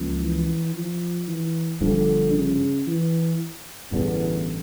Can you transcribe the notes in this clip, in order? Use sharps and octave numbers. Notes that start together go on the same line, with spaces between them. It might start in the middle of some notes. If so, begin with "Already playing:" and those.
Already playing: C#2 C#3 F3 A#3
E3
F3
E3
G1 G2 D3 F3
C#3
E3
A1 E2 G2 D3